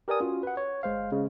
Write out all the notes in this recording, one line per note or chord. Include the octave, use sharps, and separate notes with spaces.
G4 A#4 B4 D5 G#5 D#6
C#4 F4 F#4
B4 F#5
C#5
G1 G#3 C5 F5
C#3 G#3